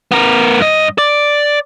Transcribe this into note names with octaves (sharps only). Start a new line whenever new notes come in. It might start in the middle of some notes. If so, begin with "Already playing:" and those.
B3 A#4
G2 D#5
D5